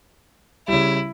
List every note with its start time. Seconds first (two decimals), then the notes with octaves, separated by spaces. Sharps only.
0.68 C#3 G3 E4